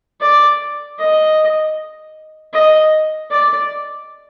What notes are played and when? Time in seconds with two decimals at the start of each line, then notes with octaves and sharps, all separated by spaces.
0.21 D5
0.99 D#5
2.54 D#5
3.31 D5